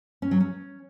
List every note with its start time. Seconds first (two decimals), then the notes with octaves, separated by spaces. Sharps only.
0.22 C#4
0.31 F#3
0.40 C#4